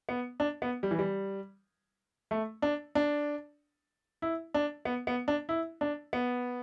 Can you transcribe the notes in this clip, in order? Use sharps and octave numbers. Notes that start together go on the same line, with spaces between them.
B3
D4
B3
G3
E3
G3
A3
D4
D4
E4
D4
B3
B3
D4
E4
D4
B3